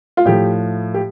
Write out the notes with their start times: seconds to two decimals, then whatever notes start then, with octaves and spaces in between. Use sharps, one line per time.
0.17 F4
0.25 A2 F3 G4
0.94 G4